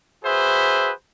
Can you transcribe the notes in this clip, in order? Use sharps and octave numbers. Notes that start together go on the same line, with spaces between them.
F#4 G#4 B4 C5 E5